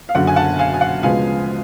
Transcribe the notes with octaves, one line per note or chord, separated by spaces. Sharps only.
F5
F#1 F#2 D3 F#5
G#5
F#5 A5
F5 G#5
G#5
F#5
D2 C#3 F3 G#3 B3 F5 G#5